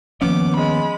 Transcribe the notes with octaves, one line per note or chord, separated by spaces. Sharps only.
D#2 F3 A#3 B3 C#4 D6
G#3 B5